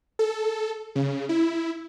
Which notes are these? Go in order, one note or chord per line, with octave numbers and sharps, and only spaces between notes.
A4
C#3
E4